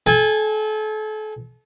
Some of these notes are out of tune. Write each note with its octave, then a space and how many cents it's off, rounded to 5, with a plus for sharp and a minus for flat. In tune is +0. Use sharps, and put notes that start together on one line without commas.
A4 -35 G#5 -15